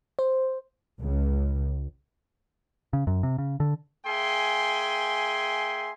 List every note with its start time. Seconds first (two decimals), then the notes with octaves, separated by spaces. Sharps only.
0.19 C5
0.99 C#2
2.93 C#3
3.07 F#2
3.23 C3
3.38 C#3
3.60 D3
4.06 A#3 G#4 E5 G5 G#5 C6